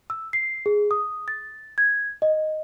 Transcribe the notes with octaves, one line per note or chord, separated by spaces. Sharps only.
E6
C7
G#4
D#6
A6
G#6
D#5